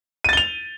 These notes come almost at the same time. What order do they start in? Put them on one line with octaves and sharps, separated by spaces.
D#7 A6 G7 F7